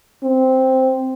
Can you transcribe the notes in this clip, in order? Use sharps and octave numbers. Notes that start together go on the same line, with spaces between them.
C4